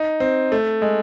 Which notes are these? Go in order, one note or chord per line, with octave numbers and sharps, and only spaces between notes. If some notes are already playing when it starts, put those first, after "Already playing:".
Already playing: D#4
C4
A3
G#3